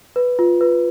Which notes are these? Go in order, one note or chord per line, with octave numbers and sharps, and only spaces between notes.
B4
F4
B4